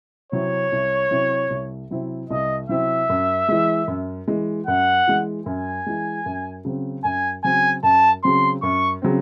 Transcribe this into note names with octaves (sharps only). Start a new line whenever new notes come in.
C3 F#3 C4 E4 C#5
C2
C3 F#3 C4 E4
C2
C3 F#3 C4 E4
C2 D#5
C3 F#3 C4 E4 E5
F#2
E3 G#3
F#2
E3 G#3
F#2 F#5
E3 G#3
F#2 G#5
E3 G#3
F#2
C#3 F#3 C4
F#2 G#5
C#3 F#3 C4 G#5
F#2 A5
C#3 F#3 C4 C6
F#2 C#6
C#3 F#3 C4